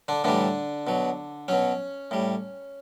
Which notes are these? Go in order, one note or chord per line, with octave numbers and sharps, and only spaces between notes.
D3 D4
A2 D3 E3 G3 D4
B2 F#3
B2 F#3 C#4
A2 G3